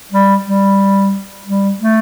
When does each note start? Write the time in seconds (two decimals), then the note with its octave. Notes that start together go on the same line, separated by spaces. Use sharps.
0.12 G3
0.45 G3
1.47 G3
1.81 A3